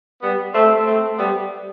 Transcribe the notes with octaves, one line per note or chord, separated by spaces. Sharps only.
G3 B3
A3 C4
A3 C4
G3 B3